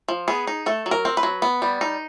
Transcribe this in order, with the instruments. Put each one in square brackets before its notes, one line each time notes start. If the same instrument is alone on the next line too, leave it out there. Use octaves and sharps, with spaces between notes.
[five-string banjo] F3
B3 G#4
D#4
A3 A4
F#3
A#4
C4
B4
F#3
B3
G3
D#4